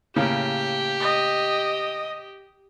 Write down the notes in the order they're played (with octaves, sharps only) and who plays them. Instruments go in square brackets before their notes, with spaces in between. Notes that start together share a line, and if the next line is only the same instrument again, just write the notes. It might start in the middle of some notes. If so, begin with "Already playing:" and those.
[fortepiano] A2 C#3 A#3 [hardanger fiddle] G4
[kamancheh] D#5